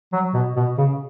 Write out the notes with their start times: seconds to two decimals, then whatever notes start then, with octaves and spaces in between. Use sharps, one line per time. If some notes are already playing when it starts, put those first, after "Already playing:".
0.13 F#3
0.34 B2
0.56 B2
0.78 C#3